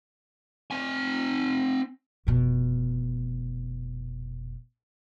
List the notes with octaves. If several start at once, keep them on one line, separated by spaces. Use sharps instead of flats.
C4 G#5
F1 B2